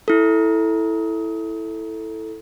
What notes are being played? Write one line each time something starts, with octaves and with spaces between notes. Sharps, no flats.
E4 A4